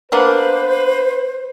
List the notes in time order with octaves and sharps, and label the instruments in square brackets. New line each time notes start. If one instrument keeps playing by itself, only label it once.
[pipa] A#3 B3 D4 [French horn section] B4 [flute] C5